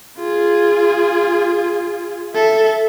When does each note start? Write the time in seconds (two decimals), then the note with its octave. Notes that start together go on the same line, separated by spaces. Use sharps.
0.18 F4 G#4
2.35 A4 E5